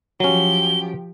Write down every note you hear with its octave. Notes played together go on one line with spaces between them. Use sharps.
F3 F#3 C#4 G4 G7